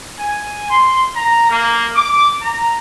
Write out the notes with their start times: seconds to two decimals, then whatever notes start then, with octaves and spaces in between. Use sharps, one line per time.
0.20 G#5
0.70 C6
1.16 A#5
1.50 A#3
1.96 D6
2.42 A#5